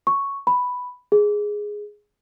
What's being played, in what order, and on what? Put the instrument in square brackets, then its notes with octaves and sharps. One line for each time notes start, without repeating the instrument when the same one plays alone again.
[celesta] C#6
B5
G#4